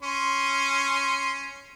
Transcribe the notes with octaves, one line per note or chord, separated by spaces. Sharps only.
C#4 C6